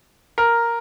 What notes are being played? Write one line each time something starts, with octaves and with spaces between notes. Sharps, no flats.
A#4